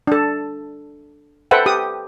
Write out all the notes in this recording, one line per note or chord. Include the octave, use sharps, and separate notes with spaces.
D4 A4
A4 B4 C5 E5 F#5 G5
G4 D#6